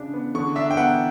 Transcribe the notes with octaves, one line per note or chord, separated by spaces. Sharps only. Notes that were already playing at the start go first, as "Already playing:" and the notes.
Already playing: C#3 D4
B3
D3 C#6
D4 E5
G5
B3 F#5